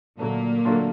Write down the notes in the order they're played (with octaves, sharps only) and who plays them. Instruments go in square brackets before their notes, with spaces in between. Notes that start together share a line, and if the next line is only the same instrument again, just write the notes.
[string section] A#2 A#3 [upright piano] D3 F#3 A3 D4
[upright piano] D3 F#3 A3 D4 F4